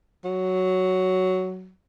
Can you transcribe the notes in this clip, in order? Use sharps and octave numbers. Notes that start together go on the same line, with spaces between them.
F#3